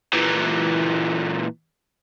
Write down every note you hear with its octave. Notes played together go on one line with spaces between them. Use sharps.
A#2 E3